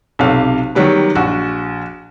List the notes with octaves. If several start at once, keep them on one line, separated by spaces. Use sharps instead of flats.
B1 C3 F5
D#3 F#3 G3 B3
A#1 F#4